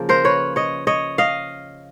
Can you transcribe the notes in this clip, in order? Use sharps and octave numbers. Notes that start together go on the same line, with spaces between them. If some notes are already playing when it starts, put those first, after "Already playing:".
Already playing: C#3 F3 A#3
A#4 C5
B4 C#5
C#5 D#5
C#5 D#5
D#5 F5